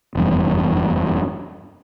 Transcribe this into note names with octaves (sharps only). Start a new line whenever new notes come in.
F1 E2 G2